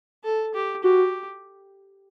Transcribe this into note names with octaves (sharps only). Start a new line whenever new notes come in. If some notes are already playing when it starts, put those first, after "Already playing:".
A4
G4
F#4 G4